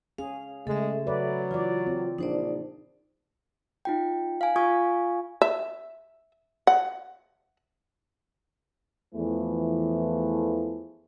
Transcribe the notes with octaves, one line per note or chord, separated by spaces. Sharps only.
C#4 G#4 F5
C#3 G#3 A3 A4 E5
F#3 B4 D5
E3 F4 D5
C4
A#1 F3 D4 D#4 C5 D5
D#4 F4 G5
F5 G#5
F4 F5 G#5 C#6 D#6 G#6
E5
F#5
E2 E3 F3 A3